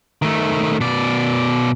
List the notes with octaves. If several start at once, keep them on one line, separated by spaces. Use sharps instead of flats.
D#3 A3
B2 D5